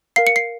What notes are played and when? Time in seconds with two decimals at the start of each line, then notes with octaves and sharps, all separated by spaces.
0.16 A#4 F5 C7
0.27 C#7
0.36 C7